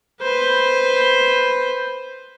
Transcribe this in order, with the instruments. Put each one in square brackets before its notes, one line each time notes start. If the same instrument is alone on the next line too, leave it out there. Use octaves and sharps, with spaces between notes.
[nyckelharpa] B4 C5